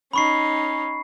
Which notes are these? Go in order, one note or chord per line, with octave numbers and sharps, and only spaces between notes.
C#4 D#4 B5 C#6 C7